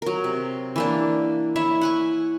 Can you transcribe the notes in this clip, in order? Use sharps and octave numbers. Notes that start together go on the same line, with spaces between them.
F#3 A#4
C3
E3 A#3 D4
E4 C#5 E5
F#5 G#5 C#6